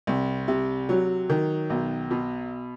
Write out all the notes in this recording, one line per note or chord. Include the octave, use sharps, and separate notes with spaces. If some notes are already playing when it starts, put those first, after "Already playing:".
C2
C3
F#3
D#3
B1
B2